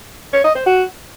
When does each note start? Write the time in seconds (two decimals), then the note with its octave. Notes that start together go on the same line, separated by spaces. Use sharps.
0.33 C#5
0.44 D#5
0.55 C5
0.66 F#4